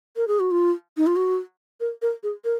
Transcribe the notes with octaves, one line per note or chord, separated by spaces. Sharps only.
A#4
G#4
F#4
F4
D#4
F4
F#4
A#4
A#4
G#4
A#4